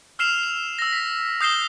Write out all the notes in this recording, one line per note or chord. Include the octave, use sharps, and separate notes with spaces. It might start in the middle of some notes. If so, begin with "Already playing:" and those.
E6 F6 C7 E7 F7
F7
E6 A#6
B6
D#6 G6 C7 E7 G7